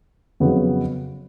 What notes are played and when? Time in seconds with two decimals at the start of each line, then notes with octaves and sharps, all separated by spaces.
0.40 F2 C#3 F#3 B3